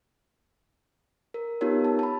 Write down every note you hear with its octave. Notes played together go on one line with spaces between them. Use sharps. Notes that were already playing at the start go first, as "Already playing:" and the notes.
A#4
B3 D#4 F4 G4 A#4 C#5
A5
A5 B5